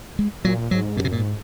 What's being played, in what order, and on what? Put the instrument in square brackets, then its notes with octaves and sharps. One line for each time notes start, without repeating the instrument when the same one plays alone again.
[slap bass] G#3
[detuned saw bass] A#2 [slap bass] F#3
[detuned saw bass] G#2 [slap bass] F#3
[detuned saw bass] F#2 [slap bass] A#2
[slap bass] C3
A#2
[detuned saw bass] G#2